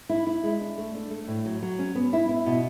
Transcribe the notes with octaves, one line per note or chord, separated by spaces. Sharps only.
E4
E4
G#3
D4
A3
D4
A3
A2
F#3
F#3
C#4
B3
E4
E4
B2